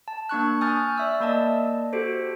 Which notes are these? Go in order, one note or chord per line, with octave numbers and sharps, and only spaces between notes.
A5
A#3 D4 C#6 F#6
G#5 C#6 D#6 F6 G6 A6
D5 E5 E6
A#3 D5 D#5 A5
F#4 G4 A4 C5